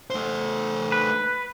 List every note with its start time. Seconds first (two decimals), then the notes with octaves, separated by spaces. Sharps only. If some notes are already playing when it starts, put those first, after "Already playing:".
0.10 A3 C5
0.92 B4